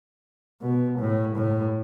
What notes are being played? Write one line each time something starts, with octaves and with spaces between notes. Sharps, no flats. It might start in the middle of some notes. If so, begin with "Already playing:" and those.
B2
A2
A2